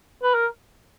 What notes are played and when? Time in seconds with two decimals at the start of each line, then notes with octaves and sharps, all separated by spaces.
0.23 B4
0.34 A#4